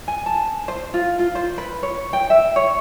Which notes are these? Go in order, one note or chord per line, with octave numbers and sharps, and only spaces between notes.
G#5
A5
C5
F4
F4
C5
B4
C#5
G5
E5
C#5